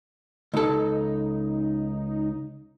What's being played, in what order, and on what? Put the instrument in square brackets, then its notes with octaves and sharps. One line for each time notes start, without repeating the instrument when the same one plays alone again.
[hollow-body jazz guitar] C#2 A4 [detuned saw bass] D#4